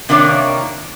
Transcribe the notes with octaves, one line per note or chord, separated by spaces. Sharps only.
C3 D#3 A#3 D4 F4 C#5